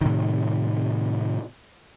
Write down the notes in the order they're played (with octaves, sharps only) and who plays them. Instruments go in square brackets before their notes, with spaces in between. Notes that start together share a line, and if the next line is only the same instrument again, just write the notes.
[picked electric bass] A2 C3 D#3